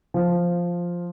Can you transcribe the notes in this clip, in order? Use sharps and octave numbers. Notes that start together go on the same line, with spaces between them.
F3